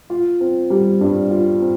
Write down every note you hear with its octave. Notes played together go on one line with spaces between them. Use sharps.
F4
C4
G3
G2
F4
C4